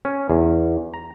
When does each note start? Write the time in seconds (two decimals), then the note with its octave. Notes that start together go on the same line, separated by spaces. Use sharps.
0.05 C#4
0.30 E2
0.94 A#5